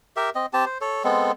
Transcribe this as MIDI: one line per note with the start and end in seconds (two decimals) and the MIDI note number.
0.16 0.30 67
0.16 0.30 70
0.16 0.30 76
0.35 0.46 60
0.35 0.46 75
0.53 0.65 60
0.53 0.65 67
0.53 0.65 81
0.66 0.78 72
0.81 1.03 69
0.81 1.03 73
1.04 1.32 56
1.04 1.32 59
1.04 1.32 60
1.04 1.32 69